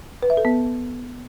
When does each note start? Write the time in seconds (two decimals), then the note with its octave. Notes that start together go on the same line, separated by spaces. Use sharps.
0.23 B4
0.30 E5
0.37 A4
0.45 B3